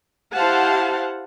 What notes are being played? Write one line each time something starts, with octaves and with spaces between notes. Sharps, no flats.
E4 G4 C5 F5 F#5 A5